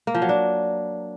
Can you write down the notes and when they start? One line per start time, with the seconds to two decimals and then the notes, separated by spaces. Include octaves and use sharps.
0.07 A#3
0.14 F3
0.22 F#3
0.29 D4